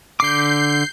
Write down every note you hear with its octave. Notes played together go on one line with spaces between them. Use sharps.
D3 D6 G6 C7